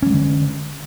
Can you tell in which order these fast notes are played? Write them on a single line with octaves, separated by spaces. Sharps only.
C#4 F#3 G#3 D3